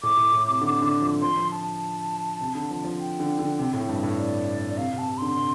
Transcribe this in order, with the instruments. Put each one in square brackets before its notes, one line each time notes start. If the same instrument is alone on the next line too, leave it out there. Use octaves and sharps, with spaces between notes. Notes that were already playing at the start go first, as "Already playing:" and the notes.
[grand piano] A2 [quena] D6
[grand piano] A2
A2
C3
D3
D3
F3
[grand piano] F3 [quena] C6
[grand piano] F3
[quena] A5
[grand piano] C3
D3
F3
F3
[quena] G5
[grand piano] D3
D3
C3
A2
G2
A2
[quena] D5
D5
[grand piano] C3 [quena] F5
[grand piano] C3
[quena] A5
[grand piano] C3
[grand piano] D3 [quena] C6
[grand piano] C3